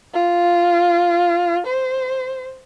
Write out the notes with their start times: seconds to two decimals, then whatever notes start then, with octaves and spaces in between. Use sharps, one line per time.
0.13 F4
1.66 C5